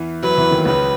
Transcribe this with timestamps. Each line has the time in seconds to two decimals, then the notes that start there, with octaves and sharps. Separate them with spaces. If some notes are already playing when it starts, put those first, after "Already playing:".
Already playing: E2 E3
0.23 F#2 F#3 B4
0.37 E2 E3
0.51 D#2 D#3
0.65 C#2 C#3 B4